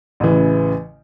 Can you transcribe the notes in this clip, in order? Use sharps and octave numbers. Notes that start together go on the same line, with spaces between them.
A1 C#3 E3